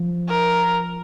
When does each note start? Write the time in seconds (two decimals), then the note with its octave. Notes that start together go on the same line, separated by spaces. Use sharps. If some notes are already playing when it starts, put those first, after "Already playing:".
Already playing: F3
0.28 A#4